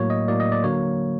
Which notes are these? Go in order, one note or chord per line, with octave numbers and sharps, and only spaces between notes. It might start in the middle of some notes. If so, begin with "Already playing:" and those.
Already playing: A2 F#3 A#3 C#5
D#5
A2 F#3 A#3 D5
D#5
D5
D3 F#3 A#3 C#5